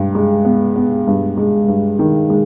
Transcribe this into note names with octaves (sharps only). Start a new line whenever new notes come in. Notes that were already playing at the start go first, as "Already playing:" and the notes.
Already playing: G2
G#3
B3
B3
G2
G#3
G2
D#3
G#3